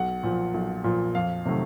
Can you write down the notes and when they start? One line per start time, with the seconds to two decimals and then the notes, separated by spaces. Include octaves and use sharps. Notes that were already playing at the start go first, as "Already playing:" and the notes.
Already playing: B1 F#5
0.23 A#2 F3
0.54 B1
0.84 A#2 F3
1.15 F2 F5
1.46 C3 D#3 F#3 A3